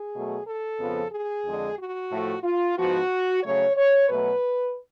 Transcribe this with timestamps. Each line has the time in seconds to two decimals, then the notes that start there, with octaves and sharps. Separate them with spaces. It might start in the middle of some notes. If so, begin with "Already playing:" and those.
Already playing: G#4
0.14 B2 F#3 A3
0.47 A4
0.79 F2 C#3 F3 B3
1.12 G#4
1.45 F2 D3 G#3
1.78 F#4
2.11 A2 F3 A3
2.44 F4
2.77 G#2 F3 B3 F#4
3.43 C#3 F#3 A3 C#5
3.76 C#5
4.08 B2 F#3 A3 B4